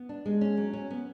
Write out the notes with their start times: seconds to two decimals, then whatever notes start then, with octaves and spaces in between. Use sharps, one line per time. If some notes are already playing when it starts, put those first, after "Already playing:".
Already playing: B3
0.09 D4
0.26 G#3
0.41 C#4
0.57 F#3
0.73 C#4
0.91 B3